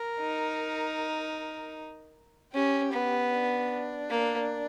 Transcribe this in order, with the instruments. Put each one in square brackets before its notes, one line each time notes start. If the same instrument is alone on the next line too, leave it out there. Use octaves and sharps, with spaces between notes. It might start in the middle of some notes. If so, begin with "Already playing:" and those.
Already playing: [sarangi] A#4
[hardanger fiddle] D#4
[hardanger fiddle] C#4 [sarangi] G4
[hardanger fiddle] B3
[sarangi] D4
[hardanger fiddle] A#3